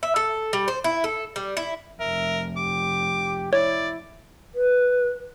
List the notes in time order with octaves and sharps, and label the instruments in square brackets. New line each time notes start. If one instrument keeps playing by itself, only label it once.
[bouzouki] E5
A4
G3
C5
E4
A4
G3
E4
[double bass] F1 [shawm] A#4 [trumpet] E5
[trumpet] G4 [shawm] D6
[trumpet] E4 [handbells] C#5 [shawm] D5
[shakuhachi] B4